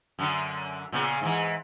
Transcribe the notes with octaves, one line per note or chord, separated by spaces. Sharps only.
F#2 D3
A#2 C#3 B3
G#2 C#3 E3